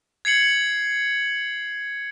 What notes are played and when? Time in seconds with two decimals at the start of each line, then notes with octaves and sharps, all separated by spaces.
0.25 G#6 C7 C#7 F#7